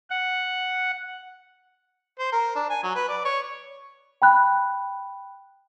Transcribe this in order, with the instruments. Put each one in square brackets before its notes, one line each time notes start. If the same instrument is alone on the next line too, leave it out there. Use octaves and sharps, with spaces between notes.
[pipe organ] F#5
[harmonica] C5
A#4
D4
G#5
F#3
B4
D5
C#5
[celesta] G5 B5 F#6